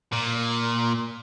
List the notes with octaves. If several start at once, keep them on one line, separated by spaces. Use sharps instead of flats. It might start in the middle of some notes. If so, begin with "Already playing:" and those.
A#2